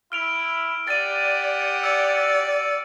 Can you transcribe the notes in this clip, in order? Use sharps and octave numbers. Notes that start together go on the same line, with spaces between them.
E4 F6 D7 F7
G4 D5 F#5 A6 D7 D#7
D5 E6 C#7 D#7